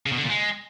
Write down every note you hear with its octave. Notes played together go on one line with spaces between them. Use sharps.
C#3
B2
D3
A#2
G#3